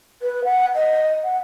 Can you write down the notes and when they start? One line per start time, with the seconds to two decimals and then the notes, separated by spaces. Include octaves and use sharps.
0.22 B4
0.44 F#5
0.75 D#5
1.24 F#5